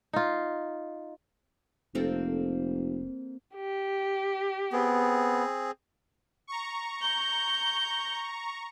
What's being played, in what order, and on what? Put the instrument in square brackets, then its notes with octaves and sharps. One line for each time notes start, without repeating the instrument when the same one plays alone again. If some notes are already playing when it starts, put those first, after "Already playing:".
[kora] D#4 F4
[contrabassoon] F1 [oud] A#3 C4 A4
[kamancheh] G4
[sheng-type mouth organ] B3 [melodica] C4 G#4
[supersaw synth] A#5 C#6
[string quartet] G6